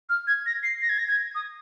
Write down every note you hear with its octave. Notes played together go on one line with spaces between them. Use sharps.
F6
G#6
A#6
C7
A#6
G#6
A#6
G#6
D#6